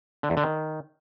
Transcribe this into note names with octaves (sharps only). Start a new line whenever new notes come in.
D3
E2
D3
D#3